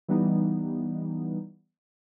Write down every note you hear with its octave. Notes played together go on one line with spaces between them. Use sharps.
E3 G3 B3 D#4